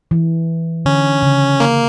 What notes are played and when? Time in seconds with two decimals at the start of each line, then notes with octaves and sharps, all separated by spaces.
0.11 E3
0.85 D3 C#4
1.23 C#3
1.60 A#3